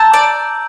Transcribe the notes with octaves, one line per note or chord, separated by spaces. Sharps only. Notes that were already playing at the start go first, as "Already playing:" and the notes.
Already playing: A5 A#5 E6 G6
D5